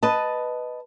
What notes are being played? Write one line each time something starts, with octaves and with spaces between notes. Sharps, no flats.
B4 D#5 A5